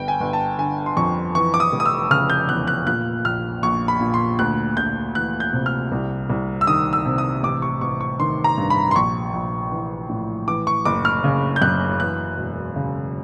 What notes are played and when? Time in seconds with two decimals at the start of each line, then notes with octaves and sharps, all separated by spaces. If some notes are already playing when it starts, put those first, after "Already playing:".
Already playing: G1 G5
0.08 G#5
0.20 G1
0.33 A5
0.59 D3 G#5
0.86 C6
0.97 F2 C#6
1.35 E3 C#6
1.54 D6
1.60 D#6
1.73 F1
1.80 D#6
1.86 E6
2.10 C#3 F6
2.30 G6
2.49 E2 F#6
2.68 F#6
2.86 A#2 F#6
3.25 A#1 F6
3.63 A#1 C#6
3.88 B5
4.01 A#2
4.14 C6
4.39 D2 F#6
4.77 D2 G6
5.15 E3 F#6
5.40 G6
5.53 C3
5.66 F6
5.92 C2
6.30 C2
6.61 E6
6.67 D#3 D#6
6.93 E6
7.05 C3
7.18 D#6
7.43 A1 D6
7.62 C#6
7.81 A1 C#6
8.01 C#6
8.20 D#3 C6
8.44 A#5
8.58 G2
8.70 B5
8.91 C6
8.95 A#1 C#6
9.34 A#1
9.72 E3
10.09 A2
10.48 E3 D6
10.67 C#6
10.85 F#1 D6
11.05 F6
11.24 C#3
11.56 G6
11.62 F#2 F#6
12.00 E3 F#6
12.38 E1
12.76 C#3